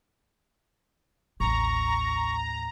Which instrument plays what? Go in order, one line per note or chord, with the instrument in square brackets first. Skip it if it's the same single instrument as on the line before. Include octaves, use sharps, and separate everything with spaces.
[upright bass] A1 D#2 [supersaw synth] A#5 [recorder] C#6